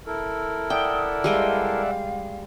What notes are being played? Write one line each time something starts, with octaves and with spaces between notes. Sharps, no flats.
E4 A4 A#4
D5 E5 F#5 G5 D#6
G3 G#3 F5 G5